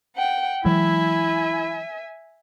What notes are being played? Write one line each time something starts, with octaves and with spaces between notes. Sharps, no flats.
F#5 G5
E3 F#3 G#3 E4 E5 G#5